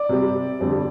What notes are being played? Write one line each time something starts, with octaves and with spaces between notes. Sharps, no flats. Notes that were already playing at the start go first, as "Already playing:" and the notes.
Already playing: D5
C3 G3
F2 D3 G3